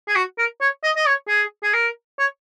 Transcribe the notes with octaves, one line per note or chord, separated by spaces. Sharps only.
G#4
F#4
A#4
C#5
D#5
D#5
C#5
G#4
G#4
A#4
C#5